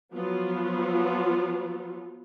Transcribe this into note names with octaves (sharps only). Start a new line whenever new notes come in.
F3 F#3 B3 F4